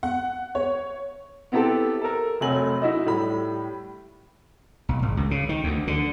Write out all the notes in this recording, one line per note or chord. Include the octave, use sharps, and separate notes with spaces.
F#5
C#5
B3 C4 E4 G4 A4
A4 A#4
F1 C3 F#3 A3 G#5 F#7
D#4 E4 F#4 D#5
A2 G3 B5
B1
G#1
C#2
C#3
D#3
D2
D3